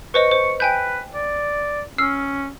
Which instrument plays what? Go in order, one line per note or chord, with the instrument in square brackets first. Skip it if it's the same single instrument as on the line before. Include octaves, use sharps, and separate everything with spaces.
[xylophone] B4 C5 D#5 [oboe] C#6
[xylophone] C5
[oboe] B4 [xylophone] G5 G#5 G6
[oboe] D5
[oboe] C#4 [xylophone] E6 F6 C7